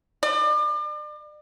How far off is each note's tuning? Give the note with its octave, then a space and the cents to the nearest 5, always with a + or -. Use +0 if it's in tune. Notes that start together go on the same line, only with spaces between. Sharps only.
D5 +35